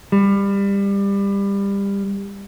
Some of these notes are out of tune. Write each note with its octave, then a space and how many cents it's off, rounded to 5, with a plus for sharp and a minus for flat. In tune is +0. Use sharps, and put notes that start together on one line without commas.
G3 +25